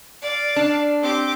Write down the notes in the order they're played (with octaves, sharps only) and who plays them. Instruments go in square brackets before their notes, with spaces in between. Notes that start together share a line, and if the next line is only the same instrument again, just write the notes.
[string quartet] D5 F5
[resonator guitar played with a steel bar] D4
[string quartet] C4 G4 D6